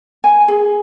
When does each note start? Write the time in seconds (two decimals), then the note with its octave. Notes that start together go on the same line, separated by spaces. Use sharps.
0.24 G#5
0.48 G#4